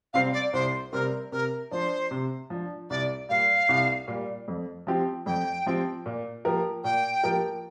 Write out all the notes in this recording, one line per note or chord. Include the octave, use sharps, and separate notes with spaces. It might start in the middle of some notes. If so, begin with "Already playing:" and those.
C3 G3 C4 F5
D5
C2 C5
C3 G3 C4 A#4
C3 A#4
F3 D4 C5
C3
F3 D4
C2 D5
A#2 G3 F5
C2
A#2 G3
F2
F3 C4 G4
F2 G5
F3 C4 G4
A#2
F3 A#3 G4 A#4
A#2 G5
F3 A#3 G4 A#4